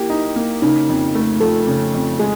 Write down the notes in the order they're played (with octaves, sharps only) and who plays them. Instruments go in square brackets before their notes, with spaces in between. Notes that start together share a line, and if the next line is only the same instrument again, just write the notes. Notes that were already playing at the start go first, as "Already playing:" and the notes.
Already playing: [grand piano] A#3 G4 [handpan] E4
[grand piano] D#4
A#3
[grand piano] C#3 [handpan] D#4
[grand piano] F2
A3
[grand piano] F3 [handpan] A4
[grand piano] C#3
F2
[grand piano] G#3 [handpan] G#4